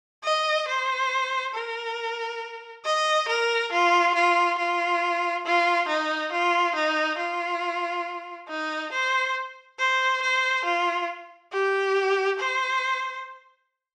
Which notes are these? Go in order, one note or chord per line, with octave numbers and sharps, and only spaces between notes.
D#5
C5
A#4
D#5
A#4
F4
F4
F4
F4
D#4
F4
D#4
F4
D#4
C5
C5
C5
F4
G4
C5